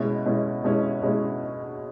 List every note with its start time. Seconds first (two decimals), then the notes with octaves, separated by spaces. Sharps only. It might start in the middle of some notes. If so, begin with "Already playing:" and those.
Already playing: B2 G#3 C#4 E4
0.25 B2 G#3 C#4 E4
0.63 B2 G#3 C#4 E4
1.02 B2 G#3 C#4 E4